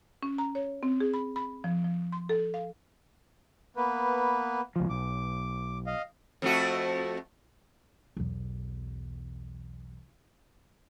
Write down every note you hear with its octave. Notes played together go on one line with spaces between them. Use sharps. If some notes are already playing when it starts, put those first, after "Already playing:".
C#4
A#5
C#5
C4
G#4
B5
B5
F3
F3
C6
A4
F5
A#3 B3 B4
C#2 F3
B1 D6
D#5 F5
F2 A3 F#4
B1 E2